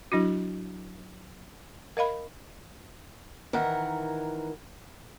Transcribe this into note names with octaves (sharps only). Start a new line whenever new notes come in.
F#3 D4 E4 F#4
A#4 D#5 F5 B5
D#3 E3 A#4 F#5